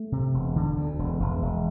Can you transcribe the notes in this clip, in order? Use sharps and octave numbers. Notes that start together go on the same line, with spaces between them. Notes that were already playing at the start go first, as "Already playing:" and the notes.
Already playing: A3
C3
E1
D3
D2
E1
E1
E1